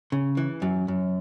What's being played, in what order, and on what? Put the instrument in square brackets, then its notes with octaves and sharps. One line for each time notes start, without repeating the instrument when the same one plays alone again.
[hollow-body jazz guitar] C#3
E3
F#2
F#2